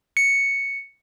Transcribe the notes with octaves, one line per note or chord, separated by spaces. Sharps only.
C#7